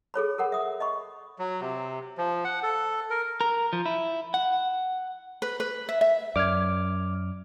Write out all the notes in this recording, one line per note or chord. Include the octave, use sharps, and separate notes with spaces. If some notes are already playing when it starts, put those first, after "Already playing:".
G#4 A4 C#5 B5
A4 A#4 F#5 B5
E5 D#6
D#5 B5 C#6
F#3
C3
F3
F#5
A4
A#4
A#4
F3
E4
F#5
B4
B4
E5
E5
F#2 D5 D6 F6 G#6